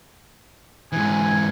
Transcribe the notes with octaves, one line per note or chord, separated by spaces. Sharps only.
G#2 E3 G#5